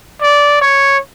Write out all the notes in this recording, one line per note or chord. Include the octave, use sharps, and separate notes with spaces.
D5
C#5